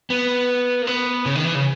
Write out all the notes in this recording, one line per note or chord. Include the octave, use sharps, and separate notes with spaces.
B3
A#3
B3
C#3
D#3
E3
C#3